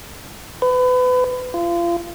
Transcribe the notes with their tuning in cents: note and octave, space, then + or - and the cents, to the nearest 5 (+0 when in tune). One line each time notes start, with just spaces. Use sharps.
B4 +30
F4 -30